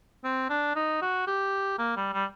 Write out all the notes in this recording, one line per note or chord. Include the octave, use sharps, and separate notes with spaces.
C4
D4
D#4
F#4
G4
A#3
G3
G3